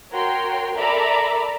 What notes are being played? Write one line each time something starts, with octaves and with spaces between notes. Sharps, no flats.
F#4 A#4 C#5 G5 C6
A4 A#4 D5 E5 A#5 B5